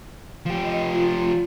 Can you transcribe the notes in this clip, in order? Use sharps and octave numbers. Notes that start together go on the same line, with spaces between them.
F3 G4
D#5
F4